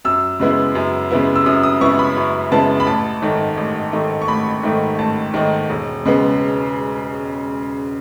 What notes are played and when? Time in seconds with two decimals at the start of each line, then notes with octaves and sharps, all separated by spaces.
0.05 F#2 E6
0.40 C#3 G#3 B3 E4
0.75 F#2
1.11 C#3 G#3 B3 E4
1.36 E6
1.46 F#2 D#6
1.63 D#6
1.81 C#3 G#3 B3 E4 C#6
1.99 B5
2.16 F#2
2.51 C#3 G#3 B3 E4 A5
2.80 B5
2.87 A1 A5
3.22 G#2 D#3 A3 D#4
3.57 A1
3.93 G#2 D#3 A3 D#4
4.22 C#6
4.28 A1 B5
4.63 G#2 D#3 A3 D#4
4.99 A1 A5
5.34 G#2 D#3 A3 D#4
5.69 E1
6.05 C#3 G#3 B3